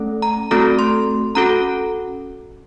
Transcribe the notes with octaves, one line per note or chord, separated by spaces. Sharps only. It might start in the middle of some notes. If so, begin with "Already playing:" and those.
Already playing: A3 C#4 A4
A#5
A3 C4 F#4 A4 A#5
C6
C#4 F#4 A4 A#5